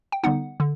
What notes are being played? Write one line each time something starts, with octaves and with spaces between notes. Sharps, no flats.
G5
D3 G3 B3 D#4 F#5
D3